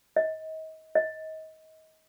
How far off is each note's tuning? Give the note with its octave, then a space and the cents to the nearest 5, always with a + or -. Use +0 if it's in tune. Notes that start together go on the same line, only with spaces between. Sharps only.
D#5 +30
D#5 +25